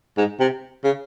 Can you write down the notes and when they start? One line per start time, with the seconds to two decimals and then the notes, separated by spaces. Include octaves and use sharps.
0.18 G#2
0.40 C3
0.84 C#3